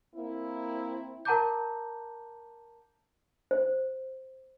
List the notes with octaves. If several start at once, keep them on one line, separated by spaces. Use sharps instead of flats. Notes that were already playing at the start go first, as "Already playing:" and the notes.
A#3 C4 E4
A#4 F#5 A5 A#5 D6 G6
C5